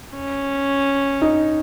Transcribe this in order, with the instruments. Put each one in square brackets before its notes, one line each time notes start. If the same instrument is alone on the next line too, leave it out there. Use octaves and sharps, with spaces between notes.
[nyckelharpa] C#4
[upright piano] D#4